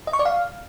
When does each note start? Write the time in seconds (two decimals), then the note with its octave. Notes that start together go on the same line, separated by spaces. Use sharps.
0.07 D#5
0.13 C#6
0.19 D5
0.25 F5